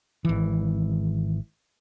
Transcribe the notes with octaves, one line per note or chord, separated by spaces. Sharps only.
G#1 E3